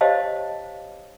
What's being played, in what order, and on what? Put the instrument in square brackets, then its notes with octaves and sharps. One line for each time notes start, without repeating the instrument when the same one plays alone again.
[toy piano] G4 C5 C#5 D#5 F5 A5